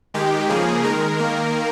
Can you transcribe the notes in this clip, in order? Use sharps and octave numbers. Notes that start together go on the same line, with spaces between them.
D#3 G#3 G4
C#3 F3 A#3 G#4
D#3 G#3 A#4
D#3 A#3